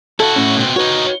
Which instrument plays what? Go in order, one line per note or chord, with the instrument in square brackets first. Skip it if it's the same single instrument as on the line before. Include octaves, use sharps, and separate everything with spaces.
[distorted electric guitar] E4 F#4 [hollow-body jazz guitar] A4
[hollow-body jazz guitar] A2 C#4
[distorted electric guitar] B2 C4
[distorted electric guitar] D#4 C#5 [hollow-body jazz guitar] F#4 B4